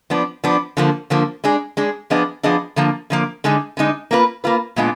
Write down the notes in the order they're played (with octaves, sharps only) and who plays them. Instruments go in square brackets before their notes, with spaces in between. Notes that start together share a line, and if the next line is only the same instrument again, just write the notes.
[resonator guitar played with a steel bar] F3 B3 D4
F3 B3 D4
D3 F3 A#3
D3 F3 A#3
G#3 D4 G#4
G#3 D4 G#4
F3 B3 D4 G#4 D#5
F3 B3 D4 G#4 D#5
D3 F3 A#3
D3 F3 A#3
D3 G#3 D#4
D3 G#3 D#4
A#3 F4 B4
A#3 F4 B4
A#2 G#3 B3 D4 F4